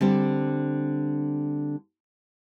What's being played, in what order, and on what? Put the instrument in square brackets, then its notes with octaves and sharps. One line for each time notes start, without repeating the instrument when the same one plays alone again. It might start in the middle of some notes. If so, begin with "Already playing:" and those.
[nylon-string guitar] D3 G3 C4